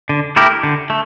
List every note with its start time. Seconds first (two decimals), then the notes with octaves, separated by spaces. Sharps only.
0.09 D3
0.36 A3 E4 G4 A#4
0.63 D3
0.90 A3